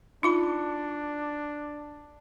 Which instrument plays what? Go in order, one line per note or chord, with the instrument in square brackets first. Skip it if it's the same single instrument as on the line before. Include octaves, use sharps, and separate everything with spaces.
[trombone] D4 [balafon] D#4 F4 B5